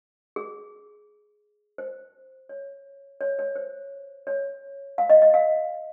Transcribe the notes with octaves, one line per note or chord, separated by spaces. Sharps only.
G#4
C5
C#5
C#5
C#5
C5
C#5
F5
D#5
D#5
F5